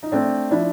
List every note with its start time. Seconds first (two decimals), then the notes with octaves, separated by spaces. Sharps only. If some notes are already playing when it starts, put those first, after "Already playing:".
0.03 D#4
0.12 A3 C4 D4
0.51 F3 D4 E4